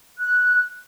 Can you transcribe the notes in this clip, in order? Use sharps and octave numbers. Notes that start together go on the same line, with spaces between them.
F#6